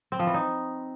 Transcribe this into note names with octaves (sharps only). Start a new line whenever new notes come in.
C4
F3
E3
D#4